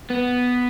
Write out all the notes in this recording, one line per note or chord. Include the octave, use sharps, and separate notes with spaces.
B3